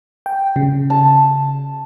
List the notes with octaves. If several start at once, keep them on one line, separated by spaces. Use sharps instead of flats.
G5
C#3
A5